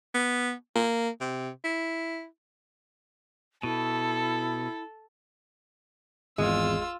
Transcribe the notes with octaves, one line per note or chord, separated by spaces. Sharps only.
B3
A#3
C3
E4
B2 E4 A4
G#1 E2 G#3 F4 E6